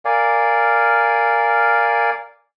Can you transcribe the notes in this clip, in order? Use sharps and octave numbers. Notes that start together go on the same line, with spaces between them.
A#4 D5 F5 G#5